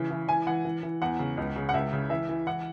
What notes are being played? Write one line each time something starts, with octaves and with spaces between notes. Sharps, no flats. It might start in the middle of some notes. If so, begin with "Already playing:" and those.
Already playing: C#3 E3
E3
E3 G#5
E3 F#5
E3
E3
E2 F#5
C#3
C#2
C#3
F#5
C#2 E5
C#3
E3 E5
E3
E3 F#5